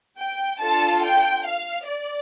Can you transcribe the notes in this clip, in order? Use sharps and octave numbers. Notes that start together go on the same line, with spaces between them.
G5
D4 F4 A4 A5
G5
F5
D5